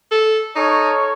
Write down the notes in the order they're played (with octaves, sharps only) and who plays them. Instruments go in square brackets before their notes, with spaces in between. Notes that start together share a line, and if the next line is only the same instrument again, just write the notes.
[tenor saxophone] A4
[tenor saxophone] D#4 [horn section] A4 A#4 C#5